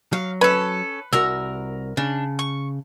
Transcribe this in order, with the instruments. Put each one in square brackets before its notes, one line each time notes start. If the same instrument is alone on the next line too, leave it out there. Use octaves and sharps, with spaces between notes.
[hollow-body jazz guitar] F#3 [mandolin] F5
[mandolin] C#4 A4 [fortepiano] B4
[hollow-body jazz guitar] C2 F#4 [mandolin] A#4 E6
[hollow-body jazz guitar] C#3 [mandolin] D4
[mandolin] C#6